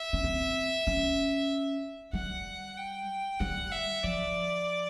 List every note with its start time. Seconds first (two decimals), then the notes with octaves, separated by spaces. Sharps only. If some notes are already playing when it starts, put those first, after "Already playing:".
Already playing: E5
0.13 C#4
0.24 C4
0.87 C#4
2.13 G3 F#5
2.77 G5
3.40 G3 F#5
3.72 E5
4.04 F3 D5